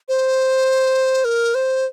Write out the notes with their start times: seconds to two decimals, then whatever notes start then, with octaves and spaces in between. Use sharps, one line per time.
0.08 C5
1.24 A#4
1.55 C5